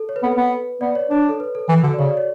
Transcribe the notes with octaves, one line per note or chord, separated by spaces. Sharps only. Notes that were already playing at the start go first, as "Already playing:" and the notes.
Already playing: A4
C#5
B4
B3 A4
B4
B3
B3 D5
C#5
D4 C#5
A4
B4
A4
E3 A4
D3 F#4
D5
C#3 C#5
D5
C#5